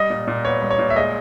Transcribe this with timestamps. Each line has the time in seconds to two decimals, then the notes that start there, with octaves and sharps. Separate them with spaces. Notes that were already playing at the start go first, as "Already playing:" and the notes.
Already playing: G3 D#5
0.10 A#2
0.27 A#2
0.45 B3 C#5
0.62 G3
0.70 C#5
0.79 A#2
0.90 E5
0.96 G#3 D#5